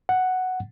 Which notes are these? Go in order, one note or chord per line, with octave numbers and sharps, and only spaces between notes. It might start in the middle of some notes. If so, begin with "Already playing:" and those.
F#5